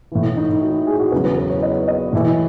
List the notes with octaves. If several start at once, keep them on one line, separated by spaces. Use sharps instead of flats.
A2 E3
E4
D#4
E4
F#4
G#4
F#4
E2 C#3 F#3 B4
B4
B4
C#5
D#5
D#5
A2 E3